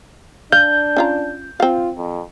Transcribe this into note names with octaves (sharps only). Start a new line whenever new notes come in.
D4 F5 G6
C#4 F4 A#5
C4 F4 F5
F2